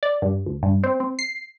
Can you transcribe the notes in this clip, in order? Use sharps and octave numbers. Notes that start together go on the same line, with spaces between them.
D5
G2
D2
G2
C4
C4
C7